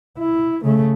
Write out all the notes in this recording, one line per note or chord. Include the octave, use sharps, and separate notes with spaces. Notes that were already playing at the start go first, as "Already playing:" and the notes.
E4
C#3 A3